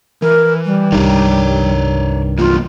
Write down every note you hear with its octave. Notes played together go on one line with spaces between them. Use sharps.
E3 A#4
G3
C2 G2 D#3 C#5 D5 A#5
E3 F#3 A#3 F4